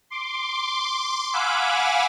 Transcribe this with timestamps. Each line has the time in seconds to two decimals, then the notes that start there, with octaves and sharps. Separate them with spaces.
0.10 C6 D6
1.33 F5 F#5 G#5 B5 D6 E6